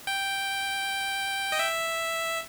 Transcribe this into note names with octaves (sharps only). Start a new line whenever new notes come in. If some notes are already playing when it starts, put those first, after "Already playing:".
G5
D#5
E5